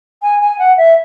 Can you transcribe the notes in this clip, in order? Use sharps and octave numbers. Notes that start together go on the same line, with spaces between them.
G#5
G#5
F#5
E5